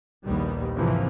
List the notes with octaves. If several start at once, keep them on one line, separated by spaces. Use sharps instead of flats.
A#1 D#2 D#3 G3 B3
G#2 C3 E3 F3 A#3